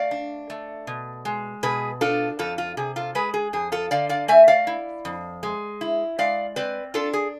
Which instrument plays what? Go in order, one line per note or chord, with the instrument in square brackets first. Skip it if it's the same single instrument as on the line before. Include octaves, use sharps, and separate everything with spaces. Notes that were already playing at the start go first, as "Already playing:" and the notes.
Already playing: [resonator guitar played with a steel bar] A3 D5 F5
D4
A3
B2
G#3
B2 G#4 B4
D4 F4 A4
F2 F4 A4
F4
C3 G#4
F4 A4
G#3 G#4 B4
G#4
F2 G#4
F4 A4
D3 D5 F5
D5 F5
A3 E5 G#5
D5 F5
E4
F2
G#3
E4
G#3 D5 F5
C4 B4 D5
D4 F4 A4
G#4